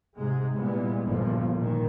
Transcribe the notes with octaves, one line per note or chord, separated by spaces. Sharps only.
G#2 C3 G#3
A#2 E3 G3 G#3 B3
G1 E2 G2 A#2 F3
A#2 D#3